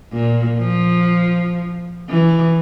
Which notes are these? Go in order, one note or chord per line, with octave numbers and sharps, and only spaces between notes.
A#2
F3
E3